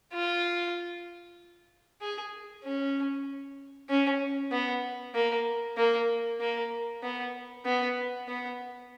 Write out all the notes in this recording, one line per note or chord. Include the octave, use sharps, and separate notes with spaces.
F4
G#4
C#4
C#4
B3
A#3
A#3
A#3
B3
B3
B3